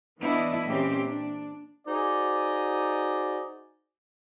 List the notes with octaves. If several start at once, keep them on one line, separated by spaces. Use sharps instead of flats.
E3 B3 D4 E4 D#5
A#2 E3 A#3 C4 C#4 G4
D4
D#4 F#4 G#4 C5 D5